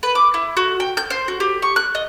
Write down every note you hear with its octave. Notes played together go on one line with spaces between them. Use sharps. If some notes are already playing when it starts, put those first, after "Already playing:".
B4
D6
E4
F#4
G5
G6
C5
F#4
G4
C#6
F#6
D#5